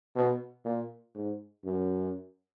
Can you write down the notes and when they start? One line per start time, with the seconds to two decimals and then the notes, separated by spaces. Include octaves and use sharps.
0.15 B2
0.65 A#2
1.15 G#2
1.64 F#2